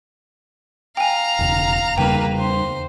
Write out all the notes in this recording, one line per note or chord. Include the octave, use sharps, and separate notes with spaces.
F5 G5 G#5 A#5
E1 E2 C#3
E2 C#3 G3 A#3 B4 G5 A#5
C5